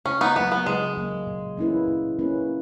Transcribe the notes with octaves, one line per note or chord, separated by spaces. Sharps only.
C#3 C#4
B3 D#4
F#3 A#3 B3
B3
C#3 G#3
F#3 A#3
A#2
A#3 C#4 E4 B4
A#2
A#3 C#4 E4 B4